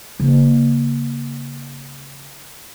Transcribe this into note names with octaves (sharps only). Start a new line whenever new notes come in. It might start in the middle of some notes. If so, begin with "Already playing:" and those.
C#3 A#3